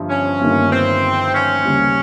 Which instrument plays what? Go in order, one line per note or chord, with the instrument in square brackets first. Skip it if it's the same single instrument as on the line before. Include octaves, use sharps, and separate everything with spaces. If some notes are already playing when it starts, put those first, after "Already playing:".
Already playing: [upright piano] G1 G2 F3
[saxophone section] C#4
[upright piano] G1 G2 D#3 A#3
[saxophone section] C4
C#4
[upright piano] D#2 C#3 G3